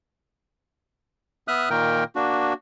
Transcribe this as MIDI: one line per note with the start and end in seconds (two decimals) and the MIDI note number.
1.48 1.69 59
1.48 1.69 76
1.48 1.69 87
1.48 1.69 89
1.48 1.69 90
1.70 2.04 46
1.70 2.04 51
1.70 2.04 58
1.70 2.04 70
1.70 2.04 79
2.16 2.53 58
2.16 2.53 62
2.16 2.53 66